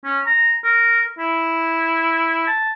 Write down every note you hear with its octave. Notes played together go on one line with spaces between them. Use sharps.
C#4
A#5
A#4
E4
A5